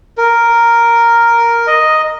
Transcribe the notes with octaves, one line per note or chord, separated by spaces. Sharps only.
A#4
D#5